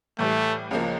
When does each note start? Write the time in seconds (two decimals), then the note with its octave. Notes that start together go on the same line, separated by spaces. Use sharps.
0.19 A2 E3 G3 A3
0.71 C#2 C#3 F3 A#3